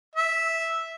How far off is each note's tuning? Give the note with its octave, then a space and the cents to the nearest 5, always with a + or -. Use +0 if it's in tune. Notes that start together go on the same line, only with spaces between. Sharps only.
E5 -5